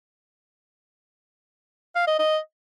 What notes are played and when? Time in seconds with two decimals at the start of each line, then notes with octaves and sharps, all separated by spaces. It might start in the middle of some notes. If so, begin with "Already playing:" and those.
1.96 F5
2.07 D#5
2.19 D#5